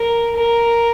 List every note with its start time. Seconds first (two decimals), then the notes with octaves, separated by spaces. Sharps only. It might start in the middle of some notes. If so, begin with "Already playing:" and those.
Already playing: A#4
0.36 A#4